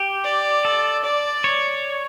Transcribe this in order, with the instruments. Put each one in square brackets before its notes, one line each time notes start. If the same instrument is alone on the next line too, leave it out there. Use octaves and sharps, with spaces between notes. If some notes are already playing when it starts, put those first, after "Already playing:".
Already playing: [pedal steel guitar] G4
[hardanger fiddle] D5
[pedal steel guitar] A4
[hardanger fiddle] D5
[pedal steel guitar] C#5